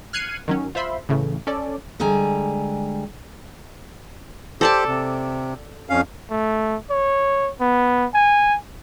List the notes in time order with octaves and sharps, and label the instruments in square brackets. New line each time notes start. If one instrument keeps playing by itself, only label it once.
[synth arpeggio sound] F6 F#6 G#6 C7 C#7 D#7
D#3 F#3 C#4
F4 C5 E5 B5 C6
A2 C#3 E3 A3
C#4 A4 D5
[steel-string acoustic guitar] D3 G3 G#3 G#5 A#5
[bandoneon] G4 C5 [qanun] A4 D5 A5
[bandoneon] C3
F2 C#4 F5
[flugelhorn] A3
C#5
B3
G#5